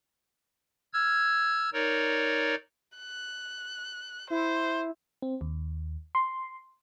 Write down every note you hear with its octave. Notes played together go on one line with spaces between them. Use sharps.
E6 F6 G#6
D#4 A#4 C#5 D5
F#6
E4 C5
C4
D#2
C6